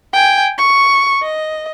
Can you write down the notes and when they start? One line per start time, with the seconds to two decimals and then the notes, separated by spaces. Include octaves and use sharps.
0.13 G5 G#5
0.58 C#6
1.22 D#5